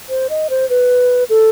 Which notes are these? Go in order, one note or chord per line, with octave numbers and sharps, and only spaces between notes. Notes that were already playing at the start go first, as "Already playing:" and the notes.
C5
D#5
C5
B4
A4